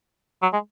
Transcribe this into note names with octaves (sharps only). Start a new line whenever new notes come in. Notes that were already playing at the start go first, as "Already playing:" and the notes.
F#3
G#3